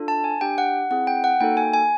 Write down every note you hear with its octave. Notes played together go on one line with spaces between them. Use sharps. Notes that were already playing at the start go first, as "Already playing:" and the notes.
Already playing: D4 F4 A4
A5
G#5
D4 G4 G5
F#5
C4 E4 G#4 F#5
G5
F#5
A#3 D#4 F#4 A4 G5
G#5
G#5